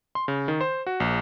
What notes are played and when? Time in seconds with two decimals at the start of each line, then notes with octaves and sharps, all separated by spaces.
0.15 C6
0.28 C#3
0.48 D#3
0.61 C5
0.87 F#4
1.00 A#1